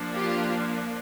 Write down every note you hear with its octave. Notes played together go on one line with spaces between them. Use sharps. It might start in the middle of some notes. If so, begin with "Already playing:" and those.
Already playing: F3 A#3 D4
F4 G4